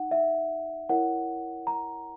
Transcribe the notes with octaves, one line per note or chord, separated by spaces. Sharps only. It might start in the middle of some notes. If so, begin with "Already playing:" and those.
Already playing: D#4 F#5
E5
E4 A#4 C#5 F#5
A#5